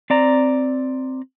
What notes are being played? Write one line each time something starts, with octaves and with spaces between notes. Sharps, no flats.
C4 D5 A#5